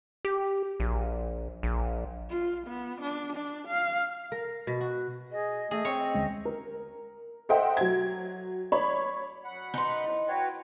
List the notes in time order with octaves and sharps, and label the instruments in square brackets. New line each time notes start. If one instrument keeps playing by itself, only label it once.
[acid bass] G4
A#1
A#1
[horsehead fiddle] F4
B3
D4
D4
F5
[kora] A#4
B2
F#4
[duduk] G#4 [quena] D#5
[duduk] A3 [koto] G#4
[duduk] C4 [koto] C#5
[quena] D#5
[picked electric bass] D2 G#3 C#4
[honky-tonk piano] A#4
A4 C5 D#5 E5 F#5 G5
F#3 G#6
C#5 D5 B5
[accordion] F#2 F#5 B5
[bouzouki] D#4 B4 [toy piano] G#5 C6
[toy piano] E4 C5 C#5
[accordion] F#4 B4 C#5 [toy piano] D#5 F#5 [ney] G5